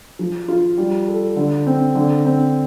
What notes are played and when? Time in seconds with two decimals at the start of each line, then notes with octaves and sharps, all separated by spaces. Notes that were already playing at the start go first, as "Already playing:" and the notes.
0.19 F3
0.48 F4
0.78 G3
1.08 A4
1.36 D3
1.67 C4
1.95 D3
2.26 C4